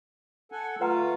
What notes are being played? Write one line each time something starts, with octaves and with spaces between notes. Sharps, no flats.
A4 F#5 G#5
A3 F4 B4 F5 F#5 A#5